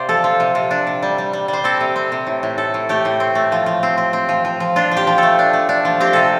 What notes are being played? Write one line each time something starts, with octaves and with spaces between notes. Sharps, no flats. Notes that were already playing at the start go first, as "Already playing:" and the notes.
Already playing: C3 C5 D5 F5
F3 A4
F3
C3
C3
D4
C3
G3
G3
G3
G3
C5
C4 A4
C3
C4
C3
A2
A2
A2 A4
A2
A3 G4
A2
C4
A3
F3
F3
C4
C4
C4
F3
F3
F3
D4 F4
F3
G4
F3
A3 A4
D4
A3
D4
F3
C4 G4
C3 A4